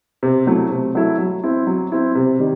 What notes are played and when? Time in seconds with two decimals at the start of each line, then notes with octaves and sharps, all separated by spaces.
0.23 C3
0.47 F#3 A3 E4
0.71 C3
0.95 F#3 A3 E4
1.18 F#3
1.44 C4 E4
1.67 F#3
1.92 C4 E4
2.15 C3
2.40 D#3 G3